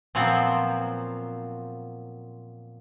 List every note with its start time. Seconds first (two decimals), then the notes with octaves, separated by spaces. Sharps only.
0.15 A#2 F3 F#3 B3 C4